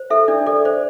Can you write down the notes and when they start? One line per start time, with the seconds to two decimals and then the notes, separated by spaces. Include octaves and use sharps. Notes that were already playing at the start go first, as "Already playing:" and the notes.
Already playing: C5
0.10 A4 E5
0.28 D4 D5
0.47 A4 D5
0.65 C5 D5